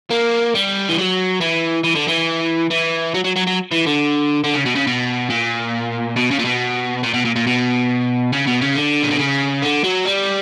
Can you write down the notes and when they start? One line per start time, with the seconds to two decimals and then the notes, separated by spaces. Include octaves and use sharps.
0.11 A#3
0.55 G3
0.89 E3
0.98 F#3
1.41 E3
1.84 E3
1.95 D3
2.08 E3
2.71 E3
3.14 F#3
3.24 F#3
3.36 F#3
3.47 F#3
3.71 E3
3.86 D3
4.44 D3
4.54 C#3
4.66 B2
4.76 C#3
4.87 B2
5.30 A#2
6.16 B2
6.31 C#3
6.39 A#2
6.45 B2
7.03 A#2
7.14 B2
7.25 A#2
7.36 A#2
7.47 B2
8.33 C#3
8.47 B2
8.62 C#3
8.76 D3
9.03 A#2
9.11 B2
9.19 C#3
9.63 D3
9.84 F#3
10.06 G3